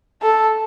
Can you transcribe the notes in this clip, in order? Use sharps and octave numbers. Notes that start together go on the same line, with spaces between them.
A4